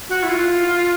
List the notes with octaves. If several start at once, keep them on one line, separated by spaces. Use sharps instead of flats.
F#4
E4
F4